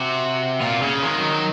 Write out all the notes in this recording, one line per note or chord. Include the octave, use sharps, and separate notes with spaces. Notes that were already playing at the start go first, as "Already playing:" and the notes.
Already playing: C3 F#4
A#2 F4
C#3 C#4
D#3 G#3
F#3
F#3